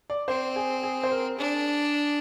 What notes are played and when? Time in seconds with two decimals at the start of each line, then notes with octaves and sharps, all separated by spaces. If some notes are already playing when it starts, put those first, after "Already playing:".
0.10 D5
0.28 C4 C5
0.56 G#4
0.83 G#4
1.03 C5
1.11 A#4
1.38 D4 G#4